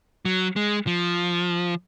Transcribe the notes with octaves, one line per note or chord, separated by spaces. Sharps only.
F#3
G#3
F3